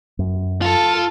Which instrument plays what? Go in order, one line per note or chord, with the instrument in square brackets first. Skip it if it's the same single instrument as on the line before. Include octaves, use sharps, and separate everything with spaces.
[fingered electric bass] F#2
[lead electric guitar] F4 [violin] A4